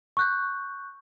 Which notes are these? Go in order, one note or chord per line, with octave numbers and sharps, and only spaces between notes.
C#6 F#6 G6